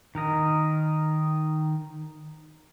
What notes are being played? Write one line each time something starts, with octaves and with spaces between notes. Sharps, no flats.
D#3 A#4 D#5